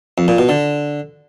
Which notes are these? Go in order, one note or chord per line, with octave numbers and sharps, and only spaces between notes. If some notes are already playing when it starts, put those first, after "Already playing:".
F2
A#2
B2
D3